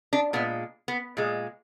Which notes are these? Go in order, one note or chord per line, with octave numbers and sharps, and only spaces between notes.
D4
A#2 G#3 B3
B3
A#2 G#3